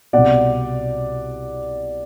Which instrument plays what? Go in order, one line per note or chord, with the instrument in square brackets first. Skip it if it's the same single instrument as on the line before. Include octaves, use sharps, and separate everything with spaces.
[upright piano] C2 B2 D5 F#5